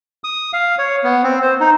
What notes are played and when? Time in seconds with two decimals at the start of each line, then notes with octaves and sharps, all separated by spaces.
0.24 D#6
0.53 F5
0.78 C#5
1.04 B3
1.24 C4
1.42 C5
1.60 D#4